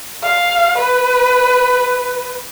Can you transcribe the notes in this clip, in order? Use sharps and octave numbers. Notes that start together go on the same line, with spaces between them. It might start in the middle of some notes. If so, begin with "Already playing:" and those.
F5
B4